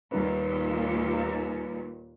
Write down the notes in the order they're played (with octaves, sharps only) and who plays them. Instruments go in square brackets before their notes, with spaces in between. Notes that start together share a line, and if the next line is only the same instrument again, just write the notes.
[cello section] D#2 A#2 [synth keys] G3 D#4 B4